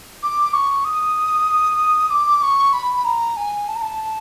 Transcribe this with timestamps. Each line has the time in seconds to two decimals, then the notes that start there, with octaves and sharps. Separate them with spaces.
0.22 D6
0.53 C#6
0.84 D#6
2.10 D6
2.41 C#6
2.72 B5
2.96 B5
3.04 A#5
3.36 G#5
3.67 A5
3.75 A#5
3.81 A5